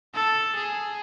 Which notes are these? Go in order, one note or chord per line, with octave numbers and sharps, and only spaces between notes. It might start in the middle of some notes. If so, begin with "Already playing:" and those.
A4
G#4